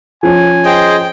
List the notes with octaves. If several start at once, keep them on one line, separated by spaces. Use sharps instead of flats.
F3 C#4 G#5
G#4 C5 D#5 G5